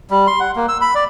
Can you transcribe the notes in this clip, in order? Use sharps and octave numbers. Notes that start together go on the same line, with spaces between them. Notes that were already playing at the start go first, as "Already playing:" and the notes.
G3
C6
F#5
A#3
E6
B5
D5